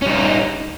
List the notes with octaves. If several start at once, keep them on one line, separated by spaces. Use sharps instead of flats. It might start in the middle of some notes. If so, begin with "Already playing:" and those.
G3 C#4 D#4